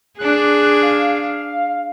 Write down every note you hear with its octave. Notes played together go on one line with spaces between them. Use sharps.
D4 G#4 F#6
F5